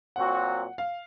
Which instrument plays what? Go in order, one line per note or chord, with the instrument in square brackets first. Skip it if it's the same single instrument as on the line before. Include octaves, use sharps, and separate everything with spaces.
[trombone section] A#2 F#3 C4 F#4 [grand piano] F#5
[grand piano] F5